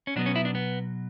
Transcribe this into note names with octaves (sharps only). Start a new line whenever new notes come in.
C#4
B2 F#3 B3 D4
C#4
E4
D4
B3